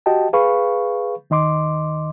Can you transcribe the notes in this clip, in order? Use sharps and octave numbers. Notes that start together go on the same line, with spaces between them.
F#4 G4 D#5 G5 A5
G#4 B4 F5 B5 C#6
D#2 D#3 D#5 C6 D6